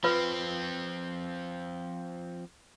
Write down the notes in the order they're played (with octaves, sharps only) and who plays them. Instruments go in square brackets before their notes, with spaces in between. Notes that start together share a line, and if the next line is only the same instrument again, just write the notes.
[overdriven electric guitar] F3 C4 [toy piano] F4 B4